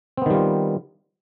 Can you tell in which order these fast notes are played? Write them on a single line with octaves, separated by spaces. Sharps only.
C4 B3 D#3 G3 F4